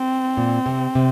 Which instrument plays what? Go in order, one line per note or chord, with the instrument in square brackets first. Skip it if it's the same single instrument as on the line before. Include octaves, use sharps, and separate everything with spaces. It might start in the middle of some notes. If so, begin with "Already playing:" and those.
Already playing: [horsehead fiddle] C4
[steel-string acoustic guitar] A#2
C3
C3